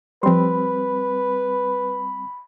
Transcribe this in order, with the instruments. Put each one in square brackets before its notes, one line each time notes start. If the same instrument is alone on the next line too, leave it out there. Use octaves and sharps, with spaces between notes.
[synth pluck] F3 C6 [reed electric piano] G3 C4 [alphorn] B4 [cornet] B5